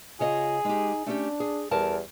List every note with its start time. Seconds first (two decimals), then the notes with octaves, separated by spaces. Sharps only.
0.20 C#3 F4 G#4 C#5 D#5
0.65 G#3 D#4 G4
1.06 A3 C#4 D4 G4
1.40 G#4
1.71 E2 G3 A#4 A5